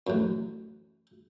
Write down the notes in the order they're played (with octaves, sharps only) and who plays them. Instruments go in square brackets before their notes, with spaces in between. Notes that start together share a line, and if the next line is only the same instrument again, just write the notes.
[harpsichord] A1 F#2